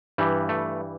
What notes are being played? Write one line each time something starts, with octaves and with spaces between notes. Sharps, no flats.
G2 E3 G3
A3